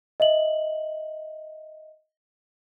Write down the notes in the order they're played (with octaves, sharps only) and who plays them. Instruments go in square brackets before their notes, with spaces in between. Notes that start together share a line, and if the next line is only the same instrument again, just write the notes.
[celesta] D#5 E5 F#7